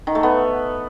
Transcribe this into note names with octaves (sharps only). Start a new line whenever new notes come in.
D#3
A3
B3